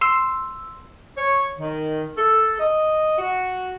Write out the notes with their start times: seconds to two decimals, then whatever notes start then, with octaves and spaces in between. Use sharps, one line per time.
0.01 C6 E6
1.16 C#5
1.59 D#3
2.17 A4
2.60 D#5
3.18 F#4